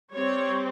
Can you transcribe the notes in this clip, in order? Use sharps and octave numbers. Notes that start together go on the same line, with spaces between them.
G3 C4 C#5